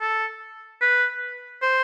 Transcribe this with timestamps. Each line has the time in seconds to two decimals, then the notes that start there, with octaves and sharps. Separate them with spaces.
0.01 A4
0.81 B4
1.62 C5